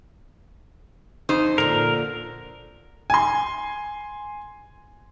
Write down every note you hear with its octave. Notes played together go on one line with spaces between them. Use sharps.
F2 D#4 C5
A#2 D3 A#4
G#5 C6